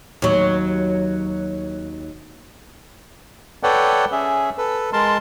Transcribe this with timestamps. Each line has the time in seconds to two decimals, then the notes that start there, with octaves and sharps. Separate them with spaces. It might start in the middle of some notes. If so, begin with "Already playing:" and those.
0.22 D#2 F#3
3.63 A4 B4 C#5 D5 F#5 G5
4.12 C#4 G#4 E5
4.58 A4 B4
4.93 G#3 A#4 A5 C6